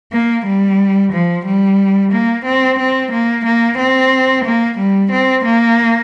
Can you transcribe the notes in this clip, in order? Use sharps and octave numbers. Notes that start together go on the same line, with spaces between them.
A#3
G3
F3
G3
A#3
C4
C4
A#3
A#3
C4
A#3
G3
C4
A#3